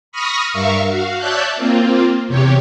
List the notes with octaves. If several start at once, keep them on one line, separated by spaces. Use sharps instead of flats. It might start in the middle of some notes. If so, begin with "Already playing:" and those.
B5 C#6 D#6 F6 A#6
G2 A#4 E5 F5 C#6
F#4 F5
C#5 D5 E5 A5 F#6 G6
A#3 C4 F4
E2 C3 G4 C#5